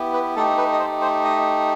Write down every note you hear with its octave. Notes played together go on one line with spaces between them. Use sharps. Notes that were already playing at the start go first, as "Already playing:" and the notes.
Already playing: B3 E4 G4
B4
A3 D#4 G4 A4
B4
D#5
C5
C5
D#5